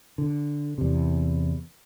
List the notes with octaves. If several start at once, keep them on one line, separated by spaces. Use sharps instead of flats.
D3
E2 C3